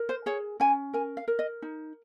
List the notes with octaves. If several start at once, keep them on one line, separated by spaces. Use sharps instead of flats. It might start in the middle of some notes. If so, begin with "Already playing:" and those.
Already playing: A#4
C5
G#4 C#5
C#4 G#5
A#4 G#5
F5
A#4
D#5
D#4